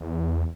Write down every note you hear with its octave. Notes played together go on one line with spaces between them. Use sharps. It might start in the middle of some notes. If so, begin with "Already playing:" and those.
E2